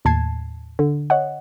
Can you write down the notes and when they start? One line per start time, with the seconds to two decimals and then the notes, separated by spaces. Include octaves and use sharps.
0.05 D#2 A2 A5 G#6 C7
0.79 D3
1.10 C#5 D#5 F#5